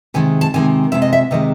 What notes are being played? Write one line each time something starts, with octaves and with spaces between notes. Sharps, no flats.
C3 D#3 G#3 G#5
A5
C3 D#3 G#3 G#5
C3 D#3 G#3 E5
D#5
E5
C3 D#3 G#3 D#5